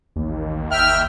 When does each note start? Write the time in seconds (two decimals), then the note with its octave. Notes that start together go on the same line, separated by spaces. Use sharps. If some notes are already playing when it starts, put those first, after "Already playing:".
0.16 A1 D#2
0.72 G1 E5 G5 F6